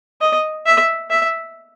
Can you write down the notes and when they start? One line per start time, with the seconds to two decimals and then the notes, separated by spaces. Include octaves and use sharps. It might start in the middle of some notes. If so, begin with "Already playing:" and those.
0.21 D#5
0.66 E5
1.10 E5